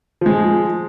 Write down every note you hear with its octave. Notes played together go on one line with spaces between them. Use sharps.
F3 G#3